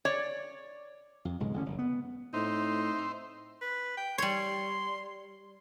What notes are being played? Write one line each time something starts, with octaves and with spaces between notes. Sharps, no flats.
C#5 D5
F2
B1 G#2 C#3 G#3
A1 D3 C#4
F#1
B3
A2 C4 D#4 C5 E5
B4
G5
G3 C#5 C6